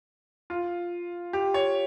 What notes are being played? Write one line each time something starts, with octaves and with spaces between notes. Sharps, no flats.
F4
G4
C#5